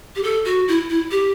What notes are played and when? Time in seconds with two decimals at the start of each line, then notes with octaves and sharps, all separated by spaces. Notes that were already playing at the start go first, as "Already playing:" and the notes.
0.16 G4
0.23 A4
0.45 F#4
0.68 E4
0.90 E4
1.11 G4